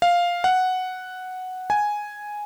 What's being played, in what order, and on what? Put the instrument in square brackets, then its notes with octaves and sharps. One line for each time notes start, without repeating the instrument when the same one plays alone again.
[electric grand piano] F5
F#5
G#5